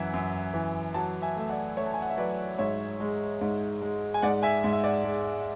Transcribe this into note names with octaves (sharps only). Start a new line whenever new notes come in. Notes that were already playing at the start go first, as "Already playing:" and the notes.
Already playing: F#2 E3 E5 F#5
F#2
E3
F#3 F#5 A5
E5 G#5
A3 E5
D5 F#5
A3 C#5 E5
A5
G#5
F#5
E5
F#3 B4 D5
G#2 C#5 E5
G#3
G#2
G#3
G#5
G#2 D5 F#5
E5 G#5
G#2
E5
D5 F#5
G#3